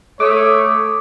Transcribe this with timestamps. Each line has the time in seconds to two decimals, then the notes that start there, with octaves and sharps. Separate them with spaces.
0.20 A3 C#5 D6 D#6